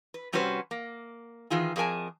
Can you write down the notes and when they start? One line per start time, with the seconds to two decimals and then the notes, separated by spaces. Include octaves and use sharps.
0.14 B4
0.33 C3 G3 C#4 F#4 B4 C5
0.71 A#3
1.50 D#3 E3 F4 G#4
1.76 F2 G#4 A#4 G#5 A5